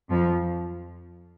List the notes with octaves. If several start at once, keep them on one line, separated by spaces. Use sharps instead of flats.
F2 F3